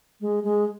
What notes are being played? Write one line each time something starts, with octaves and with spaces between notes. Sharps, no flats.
G#3
G#3